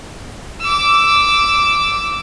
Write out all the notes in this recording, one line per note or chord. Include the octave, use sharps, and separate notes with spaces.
D6 E6